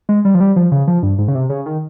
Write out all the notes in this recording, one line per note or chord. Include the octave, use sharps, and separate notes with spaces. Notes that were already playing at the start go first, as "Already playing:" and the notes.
G#3
G3
F3
G3
F3
C#3
F3
G2
G#2
C#3
C3
C#3
D#3